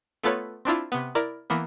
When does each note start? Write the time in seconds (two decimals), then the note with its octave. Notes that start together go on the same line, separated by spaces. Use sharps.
0.24 A3 B3 F4 A4 B4 C#5
0.65 C4 D4 E4 F4
0.92 C3 B3
1.15 E4 A#4 D5
1.50 E3 A#3 B3